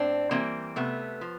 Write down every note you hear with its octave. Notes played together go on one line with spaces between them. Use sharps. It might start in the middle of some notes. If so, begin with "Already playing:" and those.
Already playing: A2 C4 D4
E3 G3 A#3 C4
C3 A3 B3
F3